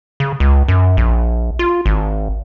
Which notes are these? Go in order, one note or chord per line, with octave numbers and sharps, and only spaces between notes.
C#3
C#2
F#2
A#1
F4
G#1